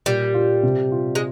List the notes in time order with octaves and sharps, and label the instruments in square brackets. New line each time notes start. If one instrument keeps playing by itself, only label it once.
[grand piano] A#2 [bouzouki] G3
[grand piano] F4
C3
F4
[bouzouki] G#3